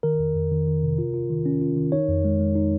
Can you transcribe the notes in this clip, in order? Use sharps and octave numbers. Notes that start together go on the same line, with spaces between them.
D#3 A#4
F2
F2
D#3
D#3
C3
F4
F4
D#3
C#4
F4
D#3
D#4 C#5
F2
G#3
G#3
D#4